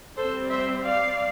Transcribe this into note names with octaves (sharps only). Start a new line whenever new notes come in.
G3 C4 A4 C5
C5 E5
D5 F5